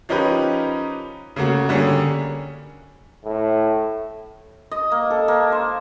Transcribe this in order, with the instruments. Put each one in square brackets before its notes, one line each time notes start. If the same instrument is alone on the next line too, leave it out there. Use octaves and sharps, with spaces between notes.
[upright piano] F3 C#4 D#4 G4 A#4 B4
C#3 A3 A#3 F#4
D3 G3 A#3 C#4 G#4
[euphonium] A2
[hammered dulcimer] D#5
A#3
A4
A#3
C5